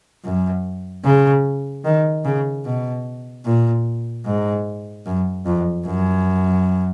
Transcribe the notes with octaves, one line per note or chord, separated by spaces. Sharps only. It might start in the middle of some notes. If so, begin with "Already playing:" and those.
F#2
C#3
D#3
C#3
B2
A#2
G#2
F#2
F2
F#2